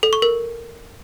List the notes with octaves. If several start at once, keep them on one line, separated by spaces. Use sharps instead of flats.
A4
C#6
A#4